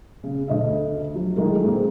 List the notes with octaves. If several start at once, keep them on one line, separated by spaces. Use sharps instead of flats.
C#3
D2 A3 D#5 E5
F3 F#3
D#3 F#3 G#3 A3 E4 A#4
G#2 A#3 C4